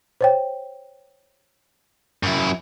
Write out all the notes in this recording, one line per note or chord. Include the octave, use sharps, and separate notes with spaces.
C5 C#5 G5
F#2 E4